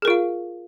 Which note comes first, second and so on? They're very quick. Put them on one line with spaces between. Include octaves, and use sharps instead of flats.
G#4 A#4 F4 F5